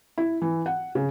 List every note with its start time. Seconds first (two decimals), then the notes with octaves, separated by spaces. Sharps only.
0.18 E4
0.42 E3
0.66 F#5
0.95 C#3